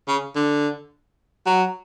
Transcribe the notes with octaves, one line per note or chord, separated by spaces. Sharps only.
C#3
D3
F#3